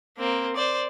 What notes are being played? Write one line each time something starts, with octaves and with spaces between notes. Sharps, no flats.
A#3 C4
C5 D5